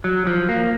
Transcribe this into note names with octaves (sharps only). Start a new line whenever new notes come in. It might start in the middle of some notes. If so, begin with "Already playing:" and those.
F#3
F3
A#3